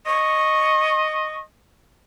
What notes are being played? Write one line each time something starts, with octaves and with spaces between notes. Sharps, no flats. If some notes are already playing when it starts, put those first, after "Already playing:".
D#5 C#6